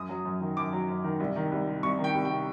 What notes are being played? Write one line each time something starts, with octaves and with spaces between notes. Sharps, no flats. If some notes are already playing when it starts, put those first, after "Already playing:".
Already playing: F#2 D#6
F#3
F#2
D#3
F#2 D6
F#3
F#2
D#3
C2
D#3
C2
C3
C2 C#6
D#3
G5
C2
G5
C3